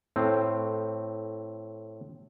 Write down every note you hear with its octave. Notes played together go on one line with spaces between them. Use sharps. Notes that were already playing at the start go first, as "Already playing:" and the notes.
A2 C4